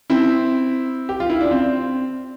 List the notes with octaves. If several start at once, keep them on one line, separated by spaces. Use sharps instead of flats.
C4 E4
G4
F4
E4
D4
C4